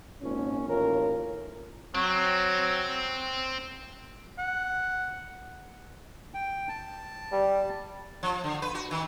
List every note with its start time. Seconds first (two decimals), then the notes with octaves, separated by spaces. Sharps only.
0.22 G#1 A#2 C#4
0.68 D#2 A2 E3 C#4 F4 A#4
1.95 F#3 C4
4.38 F#5
6.34 G5
6.69 A5
7.32 G3
8.23 F3
8.44 D3
8.62 B4
8.75 F#4
8.91 D#3